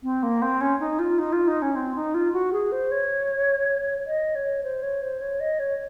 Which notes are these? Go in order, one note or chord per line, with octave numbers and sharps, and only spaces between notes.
C4
A#3
C4
C#4
D#4
F4
D#4
F4
D#4
C#4
C4
D#4
F4
F#4
G#4
C5
C#5
D#5
C#5
C5
C#5
C5
C#5
D#5
C#5